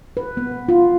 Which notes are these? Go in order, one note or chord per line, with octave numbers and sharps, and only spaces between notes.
B4
B3
F4